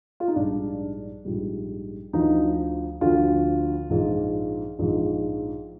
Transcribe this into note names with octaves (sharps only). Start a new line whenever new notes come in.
F4
D#4
A#1 G#2 G3 D4
A#1 G#2 G3
D2 D3 F3 D#4
D2 D3 F3 F4
A#1 G#2 F3
A#1 G#2 F3